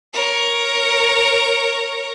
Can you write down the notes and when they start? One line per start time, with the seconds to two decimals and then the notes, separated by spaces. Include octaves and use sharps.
0.13 A#4 C#5